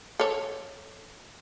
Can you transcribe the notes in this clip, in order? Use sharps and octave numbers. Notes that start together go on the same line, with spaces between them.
A4 C#5